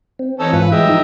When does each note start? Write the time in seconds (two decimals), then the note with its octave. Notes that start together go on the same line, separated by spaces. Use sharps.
0.19 C4
0.40 E3 C#4 D#4 A4
0.53 G#2 F4 B4 B5
0.72 G#3 D#5 E5 G5
0.88 F3 D#4